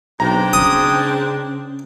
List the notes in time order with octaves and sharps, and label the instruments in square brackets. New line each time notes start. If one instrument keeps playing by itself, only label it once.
[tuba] B1 [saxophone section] G#2 C4 D4 [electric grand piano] A#5
[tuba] C#3 [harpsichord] D#6